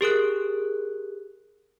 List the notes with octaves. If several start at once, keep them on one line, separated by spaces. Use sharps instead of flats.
G4 G#4 A#4 F#6